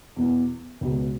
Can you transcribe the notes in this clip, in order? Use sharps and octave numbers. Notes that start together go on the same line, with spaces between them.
E2 B2 B3 E4
C#2 B2 B3 F#4